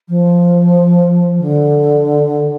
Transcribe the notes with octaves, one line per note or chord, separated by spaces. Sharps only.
F3
D3